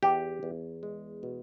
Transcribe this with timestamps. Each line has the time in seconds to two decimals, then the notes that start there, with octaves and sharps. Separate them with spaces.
0.03 E2 G4
0.43 E2
0.83 G#3
1.23 B2